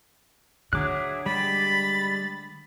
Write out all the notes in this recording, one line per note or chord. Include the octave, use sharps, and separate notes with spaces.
D3 F#3 G#4 E5 D6 F#6
G3 G#3 G4 B5 A6